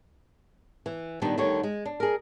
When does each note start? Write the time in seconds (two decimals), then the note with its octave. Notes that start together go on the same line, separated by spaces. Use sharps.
0.86 E3
1.22 A#2 D#3 G3 B3 D4
1.37 D2 D3 D#3 G3 C#5
1.63 G#3
1.85 D4
2.00 G#4 A#4